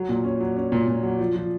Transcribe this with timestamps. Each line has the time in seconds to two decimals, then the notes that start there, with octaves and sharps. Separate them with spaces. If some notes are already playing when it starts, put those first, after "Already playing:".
Already playing: F#3
0.09 A#2
0.24 C#4
0.40 F#3
0.56 C#4
0.72 A#2
0.88 A#2
1.03 F#3
1.19 F3
1.36 F3